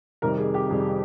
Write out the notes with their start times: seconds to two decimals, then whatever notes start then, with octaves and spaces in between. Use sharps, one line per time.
0.22 F2 C3 D#3 G3 A#4
0.38 G#4
0.54 G4
0.70 F2 C3 D#3 G3 G#4